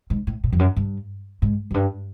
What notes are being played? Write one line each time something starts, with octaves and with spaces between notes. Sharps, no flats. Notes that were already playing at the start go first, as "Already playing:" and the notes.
G#2
A2
A#2
F2
F#2
G2
G#2
F#2
G2